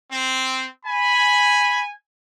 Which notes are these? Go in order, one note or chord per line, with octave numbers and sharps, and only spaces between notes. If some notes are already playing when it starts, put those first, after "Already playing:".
C4
G#5 B5